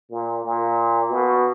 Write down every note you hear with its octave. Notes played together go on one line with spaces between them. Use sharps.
A#2
A#2
B2